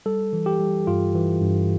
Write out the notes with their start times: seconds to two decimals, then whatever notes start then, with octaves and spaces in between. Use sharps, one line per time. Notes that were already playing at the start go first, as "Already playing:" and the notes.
0.06 G3 A4
0.33 E3
0.46 G4
0.60 G3
0.87 G2 F4
1.15 E3
1.42 G2